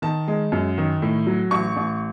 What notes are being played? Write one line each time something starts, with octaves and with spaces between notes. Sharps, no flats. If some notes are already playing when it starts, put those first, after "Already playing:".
D#3 A5
G#3
F#2
D#3
A2
F#3
A1 C#6
A1